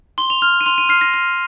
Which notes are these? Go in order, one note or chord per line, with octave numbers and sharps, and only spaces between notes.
C6 G7
F7
F6 F7
D#7
C6 F7
D#7
F6 C7
A#6
F6